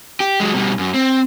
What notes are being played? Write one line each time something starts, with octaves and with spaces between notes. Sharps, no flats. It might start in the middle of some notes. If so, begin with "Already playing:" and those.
G4
F#3 G#3
B2 G3
F#2
C4